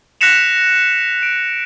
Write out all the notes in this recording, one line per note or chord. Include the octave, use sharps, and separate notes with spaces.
F#6 A#6 B6 C#7 E7 F7
D7